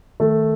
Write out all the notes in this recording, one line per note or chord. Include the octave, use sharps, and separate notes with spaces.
D#3 A3